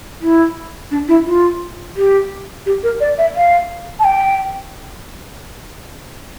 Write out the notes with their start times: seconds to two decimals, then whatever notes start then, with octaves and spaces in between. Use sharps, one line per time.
0.21 E4
0.91 D4
1.08 E4
1.25 F4
1.96 G4
2.66 G4
2.83 A#4
3.00 D5
3.18 E5
3.36 F5
3.99 A5
4.04 G5